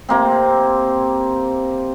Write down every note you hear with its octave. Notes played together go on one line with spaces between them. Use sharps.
C3 A#3 C4